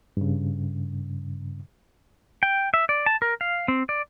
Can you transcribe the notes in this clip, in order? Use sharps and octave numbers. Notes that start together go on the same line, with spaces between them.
G2 C#3
G5
E5
D5
A5
A#4
F5
C4
D5